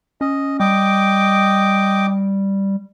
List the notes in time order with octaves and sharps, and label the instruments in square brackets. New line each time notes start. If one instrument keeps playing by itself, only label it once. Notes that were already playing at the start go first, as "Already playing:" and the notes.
[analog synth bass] C#4 [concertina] D#5
[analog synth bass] G3 [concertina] D#5 G5 D6